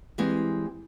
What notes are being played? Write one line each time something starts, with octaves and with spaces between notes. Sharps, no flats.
E3 G3 G#3 C4